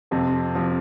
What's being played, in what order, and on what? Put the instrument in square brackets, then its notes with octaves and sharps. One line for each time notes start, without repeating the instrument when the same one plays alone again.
[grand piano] F2 C3 F3
C3 F3